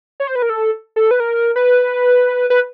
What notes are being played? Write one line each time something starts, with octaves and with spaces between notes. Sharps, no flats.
C#5
C5
B4
A#4
A4
A4
B4
A#4
B4
B4